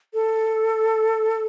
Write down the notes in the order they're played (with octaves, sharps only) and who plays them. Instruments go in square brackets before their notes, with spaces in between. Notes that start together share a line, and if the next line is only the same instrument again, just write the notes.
[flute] A4